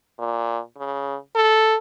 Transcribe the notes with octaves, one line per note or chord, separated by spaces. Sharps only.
A#2
C#3
A4